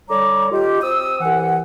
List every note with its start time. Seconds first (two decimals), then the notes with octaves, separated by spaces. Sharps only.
0.10 D3 G3 C#5 A#5 D6
0.52 D#4 F4 G4
0.82 C4 D#6 E6
1.21 C2 E3 F#5